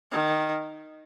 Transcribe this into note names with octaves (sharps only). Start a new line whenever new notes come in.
D#3